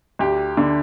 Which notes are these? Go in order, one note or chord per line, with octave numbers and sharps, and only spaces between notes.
D2 G4
D3